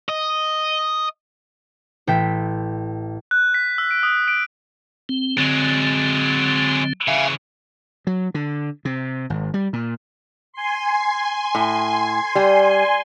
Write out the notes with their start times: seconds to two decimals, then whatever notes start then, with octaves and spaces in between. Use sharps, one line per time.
0.09 D#5
2.07 A1 E5 G5 B6
3.31 F#6
3.54 B6
3.78 E6
3.91 D7
4.03 D#6
4.28 D7
5.09 C4
5.38 D3 F#3 G#3 C4
7.08 C#3 E3 E5 F5 G#5
8.07 F#3
8.34 D3
8.85 C3
9.30 G#1
9.54 G3
9.73 A#2
10.53 G#5 C6
11.55 A2
12.35 G3